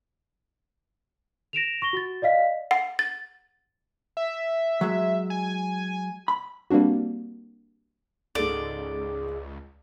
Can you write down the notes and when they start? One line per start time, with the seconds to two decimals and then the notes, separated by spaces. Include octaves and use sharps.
1.53 A#6 D7 E7 F7
1.82 C#6 A#6 G7
1.93 F#4 A6
2.22 D5 D#5 F5 B6
2.71 F#5
2.99 A6
4.17 E5
4.81 F#3 G#3
5.30 G#5
6.28 B5
6.71 G3 A#3 C4 D4 F#4
8.35 C#2 G#2 G#3 A4 D5